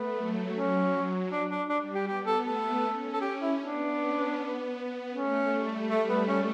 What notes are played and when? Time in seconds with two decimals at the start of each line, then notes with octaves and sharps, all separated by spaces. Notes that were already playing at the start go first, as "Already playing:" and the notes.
Already playing: A3 B3
0.16 F#3
0.54 F#3 C#4
1.31 D4
1.50 D4
1.69 G3 D4
1.94 G4
2.07 B3 G4
2.25 A4
2.45 A3 A4
2.84 C#4
3.13 A4
3.21 C#4 G4
3.40 E4
3.59 B3 D4
3.98 C#4
4.36 B3
5.12 A3 C#4
5.51 G3
5.89 A3
6.08 B3
6.27 C#4